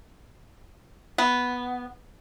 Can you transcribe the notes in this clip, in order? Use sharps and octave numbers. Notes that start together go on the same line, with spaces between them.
B3